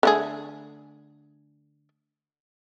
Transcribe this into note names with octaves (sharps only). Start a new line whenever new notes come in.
D3 A3 G#4